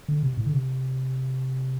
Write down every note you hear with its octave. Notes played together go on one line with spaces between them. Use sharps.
D3
C3
A2
D3
C3